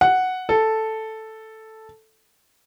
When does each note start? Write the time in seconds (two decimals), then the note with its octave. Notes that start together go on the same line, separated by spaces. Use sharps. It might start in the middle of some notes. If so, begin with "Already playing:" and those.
0.01 F#5
0.49 A4